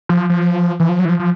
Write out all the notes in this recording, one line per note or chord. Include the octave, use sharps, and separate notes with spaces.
F3
F3
E3
F3
F#3
E3
F3
F3